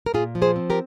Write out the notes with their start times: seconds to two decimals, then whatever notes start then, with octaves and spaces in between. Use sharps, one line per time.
0.06 A#4
0.14 A#2 F4 G#4
0.35 F3
0.42 G#4 C5
0.56 C4
0.70 G4 A#4